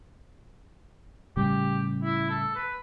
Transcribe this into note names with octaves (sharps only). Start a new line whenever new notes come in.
A2 C#3 G3 G4
E4
A4
B4